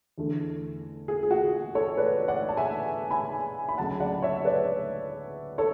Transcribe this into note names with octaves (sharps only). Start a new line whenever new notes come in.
E2 D3 A3
G#4
G#4
F#4
A4 C#5
B4 D5
D5 F#5
A5
E5 G#5
G#5 B5
B5
D2 C#3 F#3 A3 F#5 A5
D5 F#5
C#5 E5
B4 D5
A4 C#5